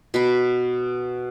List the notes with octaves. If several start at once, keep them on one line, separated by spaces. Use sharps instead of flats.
B2 B5